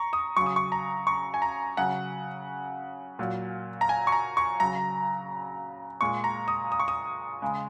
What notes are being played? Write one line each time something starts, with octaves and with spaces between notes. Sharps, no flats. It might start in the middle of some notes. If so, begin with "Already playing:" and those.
Already playing: A#5 C#6
D#6
C#3 F#3 C#6
D#6
C#6
A#5
C#6
G#5
A#5
C#3 F#3 F#5
A#2 F#3
A#5
G#5
C#6
A#5
C#6
C#3 F#3 A#5
A#2 G#3 C#6
A#5
D#6
D#6
C#6
D#6
C#3 G#3